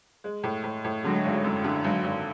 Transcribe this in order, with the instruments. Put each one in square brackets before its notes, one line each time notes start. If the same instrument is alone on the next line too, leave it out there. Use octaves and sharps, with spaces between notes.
[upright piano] G#3
A2
A2
A2
[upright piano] D3 [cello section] F#3 G#3
[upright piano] G#1
F#2
D3
[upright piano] G#1 [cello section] F#3 G#3
[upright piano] G#1